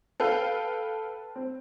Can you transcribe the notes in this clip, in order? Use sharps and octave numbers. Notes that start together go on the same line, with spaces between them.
A4 B4 F5 G5
C4